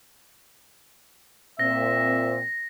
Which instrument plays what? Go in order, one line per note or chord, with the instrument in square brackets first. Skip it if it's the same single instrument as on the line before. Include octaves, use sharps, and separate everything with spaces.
[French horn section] A#2 C4 [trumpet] E5 [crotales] A#6